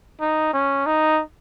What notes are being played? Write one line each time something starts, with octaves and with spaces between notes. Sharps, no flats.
D#4
C#4
D#4